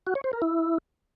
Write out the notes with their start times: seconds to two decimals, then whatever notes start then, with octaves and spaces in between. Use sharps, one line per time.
0.07 F#4
0.15 C#5
0.24 C5
0.33 A#4
0.42 E4